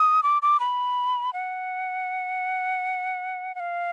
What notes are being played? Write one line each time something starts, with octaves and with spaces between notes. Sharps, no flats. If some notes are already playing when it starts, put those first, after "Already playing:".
Already playing: D#6
D6
D6
B5
F#5
F#5
F5